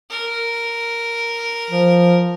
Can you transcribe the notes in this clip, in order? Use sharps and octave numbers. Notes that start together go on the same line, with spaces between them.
A#4
F3